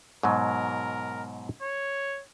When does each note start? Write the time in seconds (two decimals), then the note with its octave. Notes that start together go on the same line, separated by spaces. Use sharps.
0.23 G#2 B2 F#3 A#4
1.62 C#5